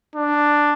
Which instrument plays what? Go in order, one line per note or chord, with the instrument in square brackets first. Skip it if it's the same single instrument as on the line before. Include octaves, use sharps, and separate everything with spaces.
[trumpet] D4